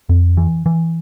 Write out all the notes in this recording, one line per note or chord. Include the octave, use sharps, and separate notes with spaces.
F2
E3
E3